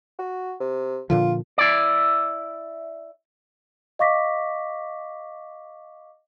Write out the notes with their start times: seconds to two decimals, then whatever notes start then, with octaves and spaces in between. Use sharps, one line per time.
0.19 F#4
0.60 C3
1.10 A#2 D3 F3 F4
1.58 E4 D5
3.99 D#5 F5 C#6 D6 A#6 B6